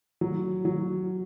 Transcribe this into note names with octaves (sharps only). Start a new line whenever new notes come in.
F#3
F#3